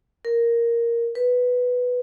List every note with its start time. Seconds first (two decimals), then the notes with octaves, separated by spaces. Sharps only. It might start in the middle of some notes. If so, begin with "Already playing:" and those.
0.25 A#4
1.15 B4